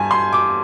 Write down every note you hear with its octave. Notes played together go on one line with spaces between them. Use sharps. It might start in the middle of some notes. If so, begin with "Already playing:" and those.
Already playing: G2 G#5
C6
D6